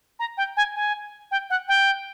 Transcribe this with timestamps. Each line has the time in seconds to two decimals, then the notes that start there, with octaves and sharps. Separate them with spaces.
0.19 A#5
0.37 G5
0.57 G#5
0.76 G#5
1.31 G5
1.50 F#5
1.68 G5